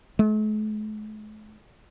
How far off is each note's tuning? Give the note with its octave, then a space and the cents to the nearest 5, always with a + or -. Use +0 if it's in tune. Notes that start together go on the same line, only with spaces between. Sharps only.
A3 -45